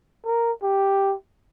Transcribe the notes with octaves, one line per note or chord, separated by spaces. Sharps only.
A#4
G4